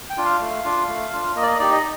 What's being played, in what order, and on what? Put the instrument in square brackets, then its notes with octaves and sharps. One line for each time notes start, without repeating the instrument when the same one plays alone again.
[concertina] G5
D4 F4
F5
A3
D4 F4
A3
D4 F4
A#3 D#5
D5
D#5
D#4 G4 D5
D#5